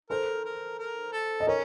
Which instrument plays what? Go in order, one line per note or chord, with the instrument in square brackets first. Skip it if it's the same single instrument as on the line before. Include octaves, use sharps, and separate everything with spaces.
[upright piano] A4 C5 [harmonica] A#4
[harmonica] A#4
A#4
A4
[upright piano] D#5
[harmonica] C#4 [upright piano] A#4 C#5